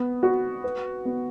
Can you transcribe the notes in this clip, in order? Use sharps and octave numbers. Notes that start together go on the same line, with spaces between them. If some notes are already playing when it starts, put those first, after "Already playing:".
Already playing: B3
F#4
B4
B3